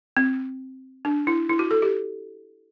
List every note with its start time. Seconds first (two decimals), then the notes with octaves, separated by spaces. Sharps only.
0.17 C4
1.05 D4
1.27 E4
1.49 E4
1.59 F#4
1.71 A4
1.82 G4